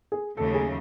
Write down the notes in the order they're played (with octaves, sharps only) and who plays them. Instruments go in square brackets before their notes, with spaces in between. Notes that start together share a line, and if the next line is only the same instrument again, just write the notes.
[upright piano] G#4
[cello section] D#2 C#3 F#3 A3 [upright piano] A4
[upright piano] G#4